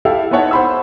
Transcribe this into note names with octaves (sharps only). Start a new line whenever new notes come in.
E4 G4 A4 E5 F5
B3 D#4 E4 C#5 F#5 A5
C5 F#5 B5 C6 E6